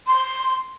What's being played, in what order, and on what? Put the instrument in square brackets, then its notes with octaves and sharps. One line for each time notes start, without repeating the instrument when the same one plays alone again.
[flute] C6